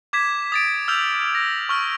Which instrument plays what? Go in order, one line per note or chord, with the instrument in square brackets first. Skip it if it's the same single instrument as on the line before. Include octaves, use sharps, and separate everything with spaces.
[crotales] D6 G#6 B6 E7
D#6 A6 D7
E6 F6 G6 F7 F#7
A#6
C#6 F6